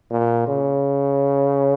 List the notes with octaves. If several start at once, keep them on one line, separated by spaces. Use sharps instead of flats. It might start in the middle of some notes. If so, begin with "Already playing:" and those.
A#2
C#3